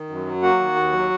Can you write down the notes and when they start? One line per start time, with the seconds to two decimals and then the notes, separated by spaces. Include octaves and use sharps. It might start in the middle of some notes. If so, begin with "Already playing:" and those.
Already playing: D#3
0.09 F#2
0.25 F#3
0.42 A#3 F#4 F#5
0.59 D#3
0.75 D#2
0.92 F#3